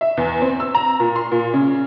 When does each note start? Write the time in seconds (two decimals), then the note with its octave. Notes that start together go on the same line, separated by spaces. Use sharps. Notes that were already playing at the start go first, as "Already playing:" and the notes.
0.01 E5
0.17 E2
0.42 C4
0.60 E6
0.75 A#5
1.00 A#2
1.16 C6
1.31 A#2
1.54 C#3